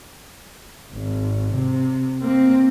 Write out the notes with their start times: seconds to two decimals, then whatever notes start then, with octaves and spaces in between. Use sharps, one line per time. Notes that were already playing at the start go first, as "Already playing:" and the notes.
0.93 G#1
1.54 C3
2.22 A#3 C4